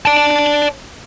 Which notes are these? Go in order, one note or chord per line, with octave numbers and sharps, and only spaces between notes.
D5 A5